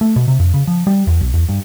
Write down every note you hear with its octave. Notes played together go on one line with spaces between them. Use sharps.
A3
B2
C3
F2
C#3
F3
G3
E2
B1
E2
G2